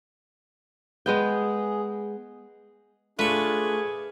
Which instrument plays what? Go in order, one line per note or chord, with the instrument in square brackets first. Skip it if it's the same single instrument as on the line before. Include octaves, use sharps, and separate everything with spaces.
[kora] G#3 B3 G5 [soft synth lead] G#4
[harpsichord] A3 C#6 [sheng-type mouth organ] D4 F4 [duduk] G#4 [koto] B4